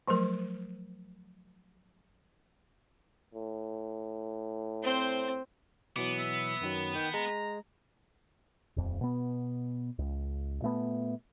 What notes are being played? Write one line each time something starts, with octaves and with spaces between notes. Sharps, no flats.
F3 F#3 A3 A#4
A2
C4 C5
B2 E3 F#3 B3 D6
E5
F#2 D#3 F#3
D#3 G5
G#3 A#5
D#1 F2
B2 B3
C#2
A#2 A3 B3